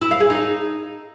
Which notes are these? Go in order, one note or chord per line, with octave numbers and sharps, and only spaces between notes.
E4
F5
G#4
D#4